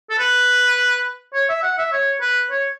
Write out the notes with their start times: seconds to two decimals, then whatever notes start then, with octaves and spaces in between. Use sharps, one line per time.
0.10 A4
0.18 B4
1.34 C#5
1.49 E5
1.63 F#5
1.78 E5
1.92 C#5
2.21 B4
2.50 C#5